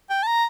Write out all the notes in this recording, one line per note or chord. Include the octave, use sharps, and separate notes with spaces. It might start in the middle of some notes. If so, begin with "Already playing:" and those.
G5
A5
A#5